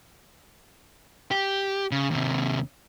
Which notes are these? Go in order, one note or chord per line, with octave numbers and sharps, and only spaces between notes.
G4
C#3
D#2 C3